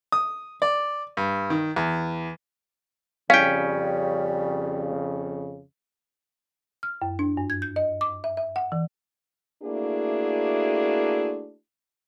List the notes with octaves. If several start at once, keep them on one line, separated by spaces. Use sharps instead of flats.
D#6
D5
G2
D#3
E2
F2 C#3 G3 C#4 F5 G5
F6
F#2
D4
G2
G#6
G6
D#5
D6
E5
E5
F#5
E3
A3 A#3 D4 E4 F#4 G#4